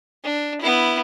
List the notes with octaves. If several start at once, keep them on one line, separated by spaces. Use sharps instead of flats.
D4
B3 E4